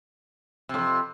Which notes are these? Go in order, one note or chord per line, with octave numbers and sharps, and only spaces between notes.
F2 A2 C3